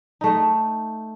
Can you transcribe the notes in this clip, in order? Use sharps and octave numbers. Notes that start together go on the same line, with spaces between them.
A3 D#4